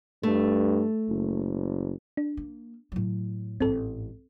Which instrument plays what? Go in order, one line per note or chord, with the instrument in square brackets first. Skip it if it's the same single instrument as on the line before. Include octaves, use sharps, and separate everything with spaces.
[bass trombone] G2 [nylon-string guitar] A3
[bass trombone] F#1
[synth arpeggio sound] D4
[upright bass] A#3
A2 F#3
[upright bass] A1 G#2 [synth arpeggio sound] C4 A4